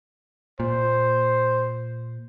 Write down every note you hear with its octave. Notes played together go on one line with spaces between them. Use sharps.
A#2 C5